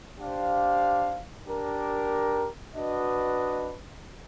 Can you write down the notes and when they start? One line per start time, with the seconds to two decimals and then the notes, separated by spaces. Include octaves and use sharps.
0.19 D4 G4 C5 F5
1.46 D4 G4 A#4
2.75 D4 F#4 B4 D#5